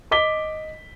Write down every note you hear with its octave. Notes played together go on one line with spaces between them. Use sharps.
D#5 D6 B6 G7